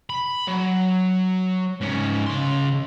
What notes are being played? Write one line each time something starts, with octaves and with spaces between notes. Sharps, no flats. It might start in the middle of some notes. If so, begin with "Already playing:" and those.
B5
F#3
G#2 C#4
C#3 C6